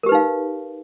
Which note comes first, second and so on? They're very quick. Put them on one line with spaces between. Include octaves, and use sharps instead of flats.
A#4 G4 B4 D#4 F5